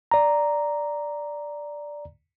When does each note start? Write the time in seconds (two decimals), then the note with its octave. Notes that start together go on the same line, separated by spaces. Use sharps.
0.11 D5 A#5